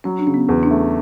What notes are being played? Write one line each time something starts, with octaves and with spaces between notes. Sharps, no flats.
F#3 C#4
D4
C#3 C#4
B3
E2
D4
A3